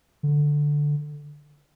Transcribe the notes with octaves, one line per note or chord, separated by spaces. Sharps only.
D3